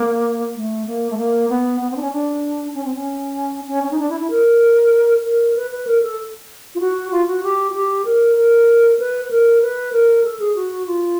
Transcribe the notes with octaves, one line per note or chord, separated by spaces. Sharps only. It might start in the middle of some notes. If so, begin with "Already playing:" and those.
Already playing: A#3
A3
A#3
A3
A#3
B3
B3
C4
D4
C#4
D4
C#4
C4
C#4
C#4
C#4
D#4
D4
E4
E4
A#4
A#4
B4
B4
A#4
A4
F4
F#4
F4
F#4
G4
F#4
G4
A#4
A#4
B4
B4
A#4
B4
A#4
A4
G#4
F#4
F4